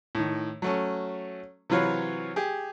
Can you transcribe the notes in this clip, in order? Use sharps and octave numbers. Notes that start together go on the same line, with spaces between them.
A2 D#3
F#3 A3 C#4
C3 E3 F#3 F4 B4 C#5
G4 G#4